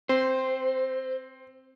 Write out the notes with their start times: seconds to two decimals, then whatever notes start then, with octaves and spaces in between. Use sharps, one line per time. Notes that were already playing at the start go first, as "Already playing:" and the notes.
0.09 C4 C5